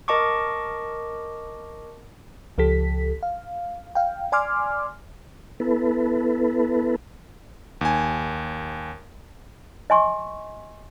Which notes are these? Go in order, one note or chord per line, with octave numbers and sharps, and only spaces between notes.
A#4 D#5 A5 C#6 D6
C#2 F3 G4 A4 B6
F5
F5 G5
D5 G#5 C6 D6 F6
B3 E4 A4 B4
D#2 G#5
D#5 G#5 C6 C#6